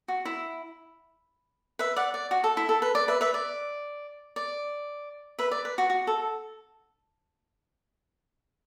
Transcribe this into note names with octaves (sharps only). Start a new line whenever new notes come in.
F#4
E4
B4 E5
D5 F#5
D5
F#4
A4
E4
A4
B4
D5
B4 E5
B4 E5
D5
D5
B4 E5
D5
B4
F#4
F#4
A4